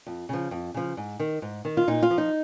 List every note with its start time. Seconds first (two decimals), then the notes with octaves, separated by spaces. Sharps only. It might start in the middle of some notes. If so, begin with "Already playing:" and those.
0.07 F2
0.29 C#3 F3
0.51 F2
0.74 C#3 F3
0.97 G#2
1.20 D#3
1.42 G#2
1.65 D#3
1.77 F4
1.87 A#2 D#4
2.03 F4
2.10 F3
2.18 D#4